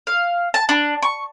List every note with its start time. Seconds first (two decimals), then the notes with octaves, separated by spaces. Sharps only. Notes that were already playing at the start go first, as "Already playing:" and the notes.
0.07 F5
0.54 A5
0.69 D4
1.02 C#6